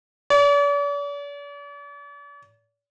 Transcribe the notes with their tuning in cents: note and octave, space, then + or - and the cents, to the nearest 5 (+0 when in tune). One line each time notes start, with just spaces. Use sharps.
D5 -45